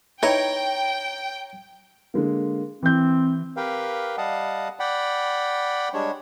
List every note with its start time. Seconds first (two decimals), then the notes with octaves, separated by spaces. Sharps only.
0.23 D#4 E4 B4 C#5 G5 A#5
2.14 D3 G#3 A#3
2.83 E3 C4 G6
3.57 G4 A#4 B4 F5 G5
4.18 G3 D#5 F5 F#5 A5
4.80 D5 F#5 G5 B5
5.94 G3 G#3 D4 C#5